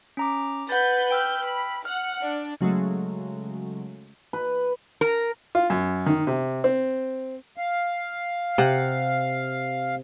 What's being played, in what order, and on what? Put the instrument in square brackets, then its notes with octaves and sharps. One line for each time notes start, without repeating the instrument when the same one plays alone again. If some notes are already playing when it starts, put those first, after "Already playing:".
[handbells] C#4 A#5 D6
[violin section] B4 G6 [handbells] F#5 A6
[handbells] G5 E6 F6
[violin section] B5
[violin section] F#5 [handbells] F6
[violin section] D4
[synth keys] C#3 F#3 G#3 A3
[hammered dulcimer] B4
[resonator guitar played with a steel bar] A#4
[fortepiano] F4
F#2
D#3
C3
C4
[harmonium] F5
[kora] C3 F#5